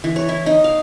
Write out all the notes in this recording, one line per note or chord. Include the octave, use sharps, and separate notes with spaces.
E3
C#5
E4
D#4
F5